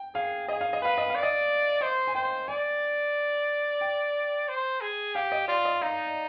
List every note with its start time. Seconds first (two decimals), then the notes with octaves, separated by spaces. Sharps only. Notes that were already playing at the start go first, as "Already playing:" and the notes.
Already playing: G5
0.15 G#4 F5
0.48 G#4 D#5
0.61 F5
0.73 D#5
0.82 B4 F5
0.98 D#5
1.10 F5
1.15 D5
1.23 D#5
1.81 C5 D#5
2.07 G#5
2.15 C5 G5
2.48 D5 G#5
3.81 G5
4.49 C5
4.81 G#4
5.14 G4 F5
5.32 D#5
5.48 F4 D5
5.65 D#5
5.82 D#4 F5